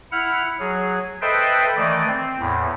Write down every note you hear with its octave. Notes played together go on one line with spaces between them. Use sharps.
E4 F#5 F6
F#3 G#4
A4 B4 C5 D#5 E5 G5
D#3 E3 A3 D5 D#5
C4
E2 A2